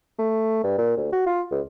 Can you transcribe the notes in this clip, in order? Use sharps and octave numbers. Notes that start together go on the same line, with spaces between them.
A3
G2
A#2
D2
F#4
F4
C#2